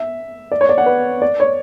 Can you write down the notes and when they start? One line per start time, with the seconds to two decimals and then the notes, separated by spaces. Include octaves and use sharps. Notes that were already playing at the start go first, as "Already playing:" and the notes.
Already playing: E5
0.52 D5
0.61 C#5
0.69 D5
0.78 F#5
0.86 B4
1.22 D5
1.40 C#5